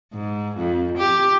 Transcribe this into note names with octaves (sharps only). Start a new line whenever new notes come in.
G#2
F2
G4